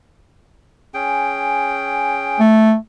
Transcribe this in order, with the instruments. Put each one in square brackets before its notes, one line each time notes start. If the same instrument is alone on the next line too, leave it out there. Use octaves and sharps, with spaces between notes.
[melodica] C#4 G#4 G5
[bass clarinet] A3